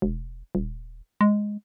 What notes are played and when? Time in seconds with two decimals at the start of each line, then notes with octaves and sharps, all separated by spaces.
0.02 E1
0.55 D#1
1.21 G#3